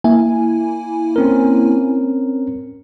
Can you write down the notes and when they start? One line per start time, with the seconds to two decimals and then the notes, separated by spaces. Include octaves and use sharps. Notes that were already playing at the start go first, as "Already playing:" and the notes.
0.04 A#3 E4 G#5
1.16 C4 C#4 A#4